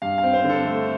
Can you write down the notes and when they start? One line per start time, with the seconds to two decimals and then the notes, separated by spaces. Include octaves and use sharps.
0.02 G2 F5
0.18 F5
0.23 C4
0.33 C5
0.44 D3
0.49 A4
0.65 A3